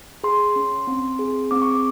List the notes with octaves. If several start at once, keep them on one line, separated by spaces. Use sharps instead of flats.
G#4 C6
C#4
C4
G#4
C4 D6
C#6
D6